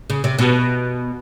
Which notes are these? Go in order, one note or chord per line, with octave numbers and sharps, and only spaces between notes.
C#3
C3
B2